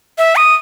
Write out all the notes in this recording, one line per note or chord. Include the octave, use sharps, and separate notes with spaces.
E5
D#6